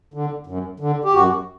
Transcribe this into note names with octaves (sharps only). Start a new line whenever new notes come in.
D3
F#2
D3
G4
F#2 F#4